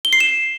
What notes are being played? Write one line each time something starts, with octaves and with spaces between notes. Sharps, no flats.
G7
C7
E7